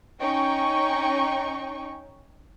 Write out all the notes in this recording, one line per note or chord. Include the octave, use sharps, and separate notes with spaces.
C#4 D#4 G5 C#6